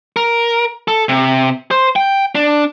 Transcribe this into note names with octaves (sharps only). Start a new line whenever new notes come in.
A#4
A4
C3
C5
G5
D4